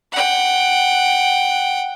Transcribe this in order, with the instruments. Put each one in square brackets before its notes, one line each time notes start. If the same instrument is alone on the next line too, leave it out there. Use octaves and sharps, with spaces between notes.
[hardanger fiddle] F#5 G5